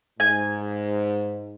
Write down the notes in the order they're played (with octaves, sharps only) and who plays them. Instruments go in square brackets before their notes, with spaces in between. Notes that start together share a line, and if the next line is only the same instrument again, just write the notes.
[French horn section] G#2 [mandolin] G#5